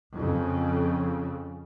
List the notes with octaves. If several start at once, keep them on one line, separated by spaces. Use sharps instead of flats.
F2 C#3